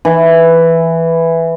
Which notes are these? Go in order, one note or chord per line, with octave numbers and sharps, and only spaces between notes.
E3